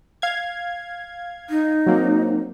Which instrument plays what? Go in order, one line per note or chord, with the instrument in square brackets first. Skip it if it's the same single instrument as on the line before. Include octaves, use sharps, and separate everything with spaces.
[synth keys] F5 G#6
[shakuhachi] D#4
[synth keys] F#3 A#3 C4